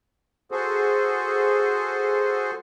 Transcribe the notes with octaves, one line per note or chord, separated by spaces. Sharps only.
F#4 G#4 A4 C5